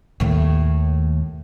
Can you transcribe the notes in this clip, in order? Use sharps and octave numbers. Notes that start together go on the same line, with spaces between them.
D#2 A2